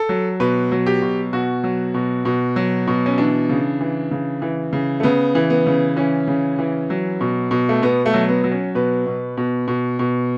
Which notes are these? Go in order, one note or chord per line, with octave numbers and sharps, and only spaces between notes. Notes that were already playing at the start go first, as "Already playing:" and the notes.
Already playing: A4
F#3
B2 B4
F#3
G4
B2
B2 F#4
F#3
B2
B2
F#3
B2
C#4
E3 D4
C#3
E3
C#3
E3
C#3
A3
C#3 B3
E3
B3
C#3
E3 C#4
C#3
E3
F#3
B2
B2
A3
B2 B3
A3
F#3
B3
F#3
C#4
B2 B4
B2
B2
B2
B2